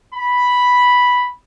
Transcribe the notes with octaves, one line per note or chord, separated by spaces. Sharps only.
B5